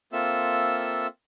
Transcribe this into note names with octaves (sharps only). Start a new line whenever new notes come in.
A#3 C4 F4 A4 E5 E6